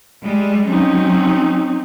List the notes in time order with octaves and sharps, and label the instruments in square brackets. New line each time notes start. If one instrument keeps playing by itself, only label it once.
[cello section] G3 G#3
[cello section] F#3 C#4 [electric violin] C4 D#4